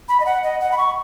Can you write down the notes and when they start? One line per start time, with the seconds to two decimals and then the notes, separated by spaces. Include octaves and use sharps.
0.09 B5
0.20 D#5
0.26 F#5
0.43 D#5
0.61 F#5
0.72 B5
0.78 C#6